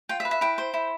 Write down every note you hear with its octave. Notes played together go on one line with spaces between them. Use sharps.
F4 G5
E5
B4
E5
E4 G5
C5
E4